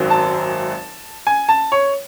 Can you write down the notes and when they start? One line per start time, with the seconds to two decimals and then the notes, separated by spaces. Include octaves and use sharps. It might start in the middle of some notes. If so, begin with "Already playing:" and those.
Already playing: G#1 F#2 D#3 F#3 C4
0.10 A5
1.27 G#5
1.49 A5
1.72 C#5